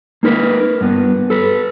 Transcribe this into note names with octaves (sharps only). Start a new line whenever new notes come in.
A#3 D#4 A#4 B4
G2 B3
A4 B4